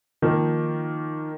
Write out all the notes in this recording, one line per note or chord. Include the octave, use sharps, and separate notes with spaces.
D#3 F3 A#3